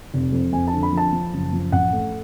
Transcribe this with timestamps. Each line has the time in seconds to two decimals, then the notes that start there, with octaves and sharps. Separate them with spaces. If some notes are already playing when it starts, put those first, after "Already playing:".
0.14 F1
0.32 F2
0.52 F2 G#5
0.68 A5
0.73 D3
0.83 B5
0.93 F3 A5
1.12 F3
1.33 F#1
1.53 F3
1.72 A1 F#5
1.93 A3